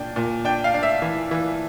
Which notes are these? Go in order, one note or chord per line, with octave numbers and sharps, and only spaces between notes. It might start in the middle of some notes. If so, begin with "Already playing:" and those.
Already playing: A#2 D4 G5
A#2
D4 G5
F5
D4
E5
E3
E3